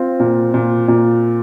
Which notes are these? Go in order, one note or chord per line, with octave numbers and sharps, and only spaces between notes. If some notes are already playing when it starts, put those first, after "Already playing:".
Already playing: C4 F4
A#2
A#2
A#2